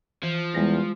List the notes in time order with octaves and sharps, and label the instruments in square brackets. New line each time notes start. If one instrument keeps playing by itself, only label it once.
[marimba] E3 [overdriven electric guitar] F3
[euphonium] E2 [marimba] G3 G#3 A#6